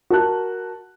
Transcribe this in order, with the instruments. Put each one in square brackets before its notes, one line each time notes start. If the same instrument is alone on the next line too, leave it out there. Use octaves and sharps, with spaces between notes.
[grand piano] F#4 A#4 A5 F#6